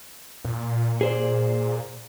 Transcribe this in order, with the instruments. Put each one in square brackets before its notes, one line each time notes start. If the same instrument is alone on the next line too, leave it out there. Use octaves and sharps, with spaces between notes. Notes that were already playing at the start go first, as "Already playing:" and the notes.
[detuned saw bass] A#2
[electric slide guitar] G#4 C5 D5